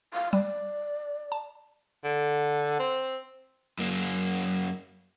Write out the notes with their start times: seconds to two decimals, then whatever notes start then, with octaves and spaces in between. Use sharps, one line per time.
0.14 F5
0.33 G3 D5
1.32 A5
2.04 D3
2.79 C4
3.79 F#2 A#3